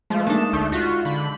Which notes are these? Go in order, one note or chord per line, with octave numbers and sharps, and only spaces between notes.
F3 G#3 A3
G#3 A#3 D4 D#4 A5
D2 A3 G6
F4 F#4 B6
D3 B5